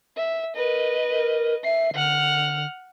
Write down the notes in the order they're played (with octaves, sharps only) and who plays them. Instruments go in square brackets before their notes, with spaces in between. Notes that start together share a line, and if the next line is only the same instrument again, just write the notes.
[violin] E5
[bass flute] A#4 [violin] B4 D#5
[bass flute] A#4
[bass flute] E5 [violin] C7
[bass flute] D3 [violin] F#5 F6